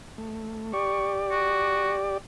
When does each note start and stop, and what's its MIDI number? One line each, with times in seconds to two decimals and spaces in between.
0.18 0.73 57
0.73 2.18 67
0.73 2.18 74
0.73 1.15 85
1.31 1.96 66